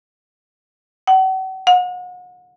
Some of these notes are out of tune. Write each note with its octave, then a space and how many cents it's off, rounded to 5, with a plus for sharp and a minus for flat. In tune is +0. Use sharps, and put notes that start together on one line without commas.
F#5 +40
F#5 -40